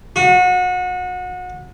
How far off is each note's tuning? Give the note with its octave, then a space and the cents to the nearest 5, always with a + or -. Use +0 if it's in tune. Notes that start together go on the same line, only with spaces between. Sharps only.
F#4 -30